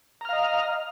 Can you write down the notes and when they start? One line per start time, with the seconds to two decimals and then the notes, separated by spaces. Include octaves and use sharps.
0.21 A#5
0.25 F6
0.29 F5
0.33 D#5